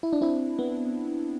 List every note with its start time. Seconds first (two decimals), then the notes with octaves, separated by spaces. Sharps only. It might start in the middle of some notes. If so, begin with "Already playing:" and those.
0.03 E4
0.13 D4
0.21 C4 E4
0.59 B3